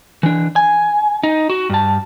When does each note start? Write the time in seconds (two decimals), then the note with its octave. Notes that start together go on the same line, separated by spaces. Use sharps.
0.23 E3 D4
0.56 G#5
1.23 D#4
1.50 F#4
1.70 G2 A5